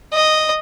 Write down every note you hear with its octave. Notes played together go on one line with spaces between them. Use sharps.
D#5